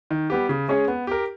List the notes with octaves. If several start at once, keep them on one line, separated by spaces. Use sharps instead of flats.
D#3
G3 B3 G4
C#3
G#3 C#4 G#4 C#5
B3
G4 A#4